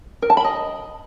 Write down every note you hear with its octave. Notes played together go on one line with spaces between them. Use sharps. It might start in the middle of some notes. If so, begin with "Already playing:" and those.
A#4
A5
B5
D#5